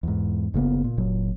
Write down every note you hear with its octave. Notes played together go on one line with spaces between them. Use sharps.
E2 G#2
F#1 C#3 A#3 B3
A#2
F#1 A#2 F#3